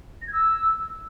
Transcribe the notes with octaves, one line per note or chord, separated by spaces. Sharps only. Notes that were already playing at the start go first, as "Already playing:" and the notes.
A#6
G#6
E6